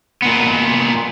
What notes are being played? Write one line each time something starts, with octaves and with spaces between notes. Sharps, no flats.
A#2 B3